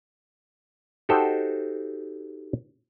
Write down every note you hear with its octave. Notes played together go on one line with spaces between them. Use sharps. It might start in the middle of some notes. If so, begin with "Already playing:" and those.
D#4 F#4 G4 A4 C5